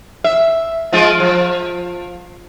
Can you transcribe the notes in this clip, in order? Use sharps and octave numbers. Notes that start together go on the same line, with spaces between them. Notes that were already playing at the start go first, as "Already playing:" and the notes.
E5
F3 G#3 F4
F3